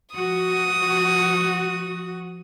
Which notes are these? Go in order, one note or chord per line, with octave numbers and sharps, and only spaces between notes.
F3 F#4 D#6